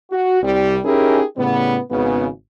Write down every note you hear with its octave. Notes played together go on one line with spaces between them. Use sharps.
F#4
C2 G3
C#4 D#4 E4 G4 G#4 A#4
A2 C#3 G3 B3
G#1 C#3 B3